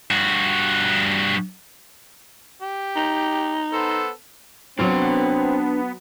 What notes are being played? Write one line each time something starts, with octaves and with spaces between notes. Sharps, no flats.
G2 F#4
G4
D#4
B3 A4 C5
F#3 B3 C4 D4 C#5 F5 C6